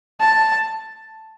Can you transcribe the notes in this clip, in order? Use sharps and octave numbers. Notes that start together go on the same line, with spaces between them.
A5